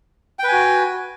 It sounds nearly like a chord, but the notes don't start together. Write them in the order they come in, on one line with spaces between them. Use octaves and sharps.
G5 B4 G#5 F#4